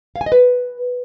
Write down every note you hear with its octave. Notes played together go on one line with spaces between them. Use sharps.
F5
G#5
D#5
B4